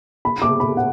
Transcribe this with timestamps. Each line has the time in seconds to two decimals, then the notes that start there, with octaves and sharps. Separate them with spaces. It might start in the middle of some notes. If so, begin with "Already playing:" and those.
0.25 B5
0.42 D6
0.60 B5
0.77 F#5